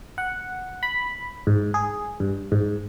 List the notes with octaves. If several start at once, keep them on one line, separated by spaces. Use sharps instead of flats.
F#5
B5
G#2
G#4
G2
G#2